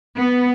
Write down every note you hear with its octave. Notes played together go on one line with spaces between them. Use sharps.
B3